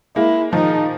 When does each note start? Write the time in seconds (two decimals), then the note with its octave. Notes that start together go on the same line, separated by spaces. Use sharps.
0.16 G#3 A#3 E4
0.53 D#3 F3 D#4